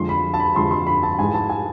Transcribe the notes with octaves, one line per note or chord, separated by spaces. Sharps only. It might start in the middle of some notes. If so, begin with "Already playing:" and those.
Already playing: F2 D3 F3 G#3 C6
B5
A5
B5
F2 D3 F3 G#3 C6
C6
B5
A5
G#2 E3 G#3 G#5
A5
G#5